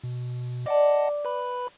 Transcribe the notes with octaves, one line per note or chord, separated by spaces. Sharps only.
B2
D5 D#5 F#5 A5
B4 B5